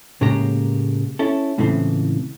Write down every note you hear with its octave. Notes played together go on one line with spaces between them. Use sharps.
A2 C#3 G#3 A#3 G4 A#5
C#4 E4 A4
C#2 A2 C#3 E3 A3 C4